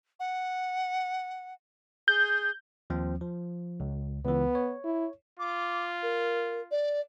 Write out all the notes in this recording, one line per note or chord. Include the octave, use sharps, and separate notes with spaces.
F#5
G#4 G6
D#2 F3 C4
F3
C#2
C#2 E3 B3
C#5
E4
F4 D6
A#4
D5